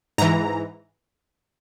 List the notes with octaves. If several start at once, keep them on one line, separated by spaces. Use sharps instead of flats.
G#2 E3 A#5